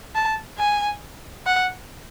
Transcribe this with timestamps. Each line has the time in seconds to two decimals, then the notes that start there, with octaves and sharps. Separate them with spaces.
0.15 A5
0.58 G#5
1.47 F#5